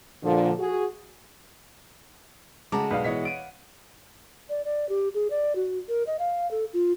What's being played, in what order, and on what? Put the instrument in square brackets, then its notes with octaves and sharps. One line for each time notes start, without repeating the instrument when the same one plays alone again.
[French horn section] A#2 D3 F3
F#4 G#4
[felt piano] C#3 A5 A#5 [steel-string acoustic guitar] G#3 E4 F#4 [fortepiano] D6
[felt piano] B1 [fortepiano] B4 D5 F5
[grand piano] B2 E3 [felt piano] C#5 D#5 B6
[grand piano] F#5 D7 D#7
[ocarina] D5
D5
G4
G#4
D5
F#4
A#4
D#5
F5
A4
F4